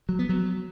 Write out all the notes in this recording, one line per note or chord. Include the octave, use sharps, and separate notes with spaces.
F#3
B3
F#3